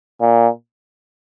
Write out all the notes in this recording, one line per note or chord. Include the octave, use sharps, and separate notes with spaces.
A#2